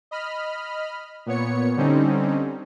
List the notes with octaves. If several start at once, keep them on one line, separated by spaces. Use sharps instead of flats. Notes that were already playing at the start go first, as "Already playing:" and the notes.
D#5 B5 F6
A#2 B3 C#5 C#7
D3 G3 C4 C#4 D#4